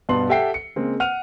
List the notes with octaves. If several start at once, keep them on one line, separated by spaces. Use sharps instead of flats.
G2 B2 B3 A5 C6 F#7
G4 A4 E5 F#5 G5 C7
C#7
C#3 G#3 A#3 C4
F#5 F6 D#7 F7